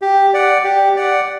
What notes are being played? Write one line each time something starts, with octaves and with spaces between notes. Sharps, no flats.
G4
D5 F#5
G4
D5 F#5